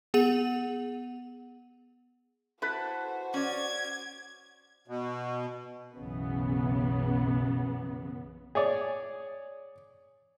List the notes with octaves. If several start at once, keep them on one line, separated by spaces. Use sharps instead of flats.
B3 G#4 F#5 D#7 F7 F#7
E4 F#4 A4 B4 C5
C#4 D5 G#6
B2
B1 F#2 C#3 E3 B3
G#4 C#5 D5